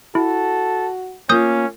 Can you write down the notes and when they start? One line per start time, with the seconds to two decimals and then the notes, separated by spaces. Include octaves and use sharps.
0.15 E4 F#4 A4
1.29 A#3 C#4 F4 D#6 G6